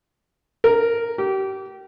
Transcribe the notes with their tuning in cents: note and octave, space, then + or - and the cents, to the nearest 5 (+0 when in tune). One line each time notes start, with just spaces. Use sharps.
A#4 -5
G4 -30